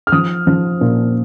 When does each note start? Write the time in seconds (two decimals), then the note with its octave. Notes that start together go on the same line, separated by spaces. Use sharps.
0.07 F6
0.12 F3 D#6
0.47 F3
0.81 A#2